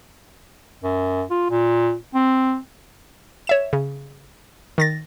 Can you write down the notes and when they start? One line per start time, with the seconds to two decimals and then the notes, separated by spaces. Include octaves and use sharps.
0.83 F#2
1.30 F4
1.50 A#2
2.14 C4
3.47 C#5 E5 E7
3.73 C#3
4.78 D#3 A6 A#6